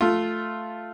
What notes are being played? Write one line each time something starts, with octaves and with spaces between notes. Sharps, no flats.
A3 F4